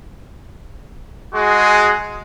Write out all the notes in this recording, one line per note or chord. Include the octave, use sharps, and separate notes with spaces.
G#3 F#4 G#4